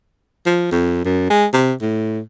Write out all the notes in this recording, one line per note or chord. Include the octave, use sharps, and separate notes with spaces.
F3
F2
F#2
G#3
C3
A2